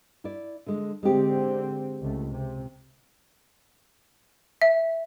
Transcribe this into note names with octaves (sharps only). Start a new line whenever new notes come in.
E4 D5
D3 G#3
D3 G#3 C4 G4
C#2 A3
C3
E5